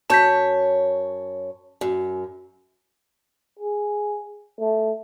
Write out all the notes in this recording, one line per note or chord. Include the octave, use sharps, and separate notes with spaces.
F#2 C#5 A5 G6 B6
F#2
G#4
A3